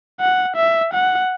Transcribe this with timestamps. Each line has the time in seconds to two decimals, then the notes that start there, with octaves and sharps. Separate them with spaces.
0.21 F#5
0.57 E5
0.94 F#5